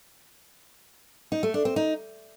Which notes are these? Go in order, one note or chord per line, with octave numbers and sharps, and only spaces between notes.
D#4
A3
D4
C4
D#4